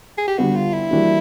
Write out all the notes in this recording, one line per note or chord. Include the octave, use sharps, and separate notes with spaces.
G#4
G4
D3 G3 B3 F#4
F4
E4
E3 G3 A#3 D4 F#4